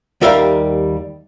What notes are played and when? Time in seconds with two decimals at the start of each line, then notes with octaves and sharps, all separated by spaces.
0.21 D#2 G3 A#4 E5 F5 G5